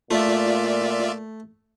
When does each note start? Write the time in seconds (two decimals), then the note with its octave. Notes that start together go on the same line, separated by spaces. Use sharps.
0.11 A#2 A3 F4 D5 E5